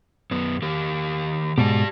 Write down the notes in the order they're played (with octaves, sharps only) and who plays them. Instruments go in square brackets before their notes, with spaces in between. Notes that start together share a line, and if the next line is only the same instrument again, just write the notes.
[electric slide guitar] F#2 B3
D#3 G4 A#4
[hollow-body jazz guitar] G#2 B2 [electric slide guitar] G4 D5 A5